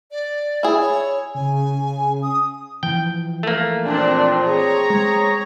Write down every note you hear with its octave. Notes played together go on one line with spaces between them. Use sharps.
D5
E4 G#4
C#5
C#3 G#5
D#6
E3 F3 G5
A3 A#3
A#2 C4 D4
C4 G#4 C#5 A#5
G#3